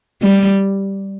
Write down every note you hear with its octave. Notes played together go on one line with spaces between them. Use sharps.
G3